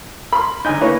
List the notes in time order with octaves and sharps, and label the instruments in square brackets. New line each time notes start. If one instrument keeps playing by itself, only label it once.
[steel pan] A#4 [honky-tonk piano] B5 C6
[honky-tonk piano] D3 G6 [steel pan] D#4 D#5 G#5
[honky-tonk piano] A#3 [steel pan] E4 B4 C#5